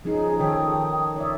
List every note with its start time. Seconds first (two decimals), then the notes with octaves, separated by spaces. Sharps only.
0.05 F3 C#4 D#4 G#4
0.39 D#3 A4 C#5 G5 D#6
1.16 C#5 D5 E5